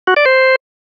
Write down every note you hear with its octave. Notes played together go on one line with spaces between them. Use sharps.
F#4
D5
C5